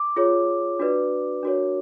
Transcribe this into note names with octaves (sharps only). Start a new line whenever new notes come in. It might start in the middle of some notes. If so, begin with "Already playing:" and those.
Already playing: D6
F4 G#4 C#5
D4 F#4 B4 D5
D4 F#4 A#4 C#5